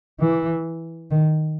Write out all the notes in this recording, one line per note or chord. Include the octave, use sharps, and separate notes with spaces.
E3
D#3